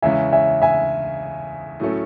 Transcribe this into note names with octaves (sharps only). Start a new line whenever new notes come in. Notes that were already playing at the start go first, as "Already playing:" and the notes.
E2 C#3 G#3 C#4 E5 G#5
E5 G#5
E5 G#5
A2 F#3 A3 C#4